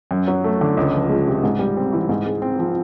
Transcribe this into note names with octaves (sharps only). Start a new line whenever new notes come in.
F#2
F#3
A3
D3
C#2
F3
G#3
C3
G#2
G3
C4
E3
G#2
G#3
C4
F3